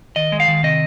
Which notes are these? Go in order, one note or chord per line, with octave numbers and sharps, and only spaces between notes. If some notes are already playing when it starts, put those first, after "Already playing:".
D#3 D#5
G#3
F5
D#3
C3 D#5